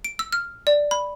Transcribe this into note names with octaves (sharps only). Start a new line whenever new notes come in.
D7
E6
F6
D5
B5